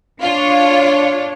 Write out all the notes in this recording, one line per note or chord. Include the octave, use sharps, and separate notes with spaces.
D4 F4 C#5